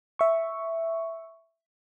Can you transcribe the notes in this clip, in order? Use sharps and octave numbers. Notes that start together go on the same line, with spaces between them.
E5 C#6